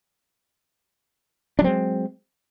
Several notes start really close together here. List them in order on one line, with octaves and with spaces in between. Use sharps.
D4 F#3 C4 G#3